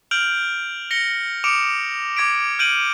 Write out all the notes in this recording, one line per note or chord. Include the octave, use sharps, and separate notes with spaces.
F6 G6 D7 F7 F#7
A#6 C#7 F7 G7
D6 D#6 C#7 D7 E7 F7
D6 G#6 B6 D7
F6 G6 D7 D#7 F#7